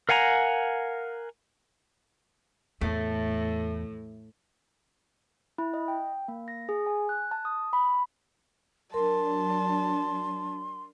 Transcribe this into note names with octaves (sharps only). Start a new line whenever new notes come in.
A#4 F5 F#5 G#5 A#5
E2 A2 A3
E4
D#5
G5
A#3
A#6
G#4
G#5
F#6
A5
D#6
B5
F#3 D4 A#4 A5 C6